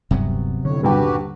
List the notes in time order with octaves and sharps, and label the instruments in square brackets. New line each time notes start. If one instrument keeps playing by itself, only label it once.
[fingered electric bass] D#1 G2 [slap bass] C3 F#3 B3
[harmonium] F2 A2 C#5 [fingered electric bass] D3
[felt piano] D#1 G2 G5 [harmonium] F#4 G4 B4